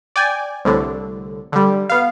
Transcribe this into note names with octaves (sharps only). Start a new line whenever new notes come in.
D5 G5 G#5
C2 A2 D3
D3 G3
B3 F5